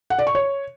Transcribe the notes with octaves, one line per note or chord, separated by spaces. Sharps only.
F#5
D5
C#6
C#5